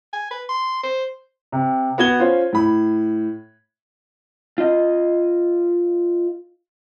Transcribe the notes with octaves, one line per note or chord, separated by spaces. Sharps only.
G#5
B4
C6
C5
C3
B3 F#4 G#6 G7
C#4 F4 C5
A2 B5
F4 D#5